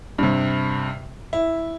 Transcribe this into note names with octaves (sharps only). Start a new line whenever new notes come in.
G2 C3
E4